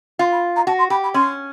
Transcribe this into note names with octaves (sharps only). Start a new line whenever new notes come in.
F4 C6
B5
A#5
F#4 A5
C6
G4 B5
B5
C#4 C6